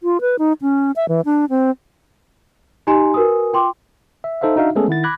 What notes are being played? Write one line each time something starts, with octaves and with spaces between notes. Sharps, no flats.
F4
B4
D#4
C#4
E5
E3
D4
C4
D#4 G4 D#5 G#5 A#5 C6
F#4 A#4 B4 G#5 D#6
F4 G5 C6 D6
E5
D#4 A4 C5 E5 F5
D4 D#4 F#4 E5 F5
G#3 A3 B3 C#4 G#4 A4
D#3 E4 F#5 A6
B5 D6 F#6 G#6 A#6